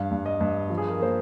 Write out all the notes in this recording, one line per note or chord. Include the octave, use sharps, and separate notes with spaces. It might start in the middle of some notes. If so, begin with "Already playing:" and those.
Already playing: G2 F5
G2
D#5
G2
F3
G#4
A#4
A#3 C5